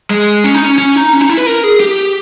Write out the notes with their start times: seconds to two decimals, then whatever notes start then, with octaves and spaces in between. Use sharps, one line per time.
0.10 G#3
0.44 C#4
0.54 D#4
0.65 C#4
0.78 C#4
0.96 D#4
1.13 C#4
1.21 D#4
1.29 E4
1.38 B4
1.46 A#4
1.64 G#4
1.80 G4